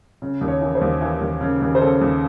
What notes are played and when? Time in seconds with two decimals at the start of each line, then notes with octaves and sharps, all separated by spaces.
0.22 C#3
0.41 D#2
0.48 C#5
0.62 E3
0.75 C5
0.81 D#2
1.01 E3
1.21 D#2
1.41 C#3
1.61 D#2
1.75 C5
1.81 C#3 A4
2.01 D#2